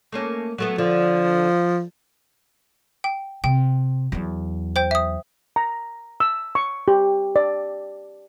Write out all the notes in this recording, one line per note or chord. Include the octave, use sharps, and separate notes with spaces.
A3 A#3 C#4
F#3 A3 B3
D3 F3
G5
C3 G5
E2 F#3
C5 G5 G6
E5 D#6
A#5
E6
C#6
G4
D5